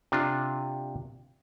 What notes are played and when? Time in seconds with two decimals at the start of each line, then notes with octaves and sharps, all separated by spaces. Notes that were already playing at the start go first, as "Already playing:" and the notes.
0.12 C3 D4 F4